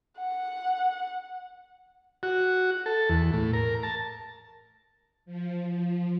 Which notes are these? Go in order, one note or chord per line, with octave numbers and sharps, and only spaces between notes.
F#5
F#4
A4
E2
A2
A#4
A5
F3
F3